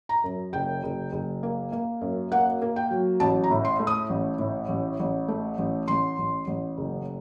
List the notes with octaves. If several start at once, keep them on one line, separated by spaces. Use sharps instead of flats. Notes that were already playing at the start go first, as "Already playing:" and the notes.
A#5
F#2
F#1 G5
F#1
F#1
A#3
A#3
F#2
A#3 F#5
A#3
G5
F#3
A1 A5
A#5
A2
C6
A3
D#6
A1
A2
A1
A1
A3
A1
A1 C6
A1
A1
F#1